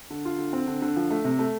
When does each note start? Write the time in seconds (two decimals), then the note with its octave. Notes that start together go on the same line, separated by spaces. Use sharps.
0.10 D3
0.25 F4
0.38 D3
0.53 C4
0.67 D3
0.82 D3
0.96 F3
1.10 A3
1.25 C3
1.39 A3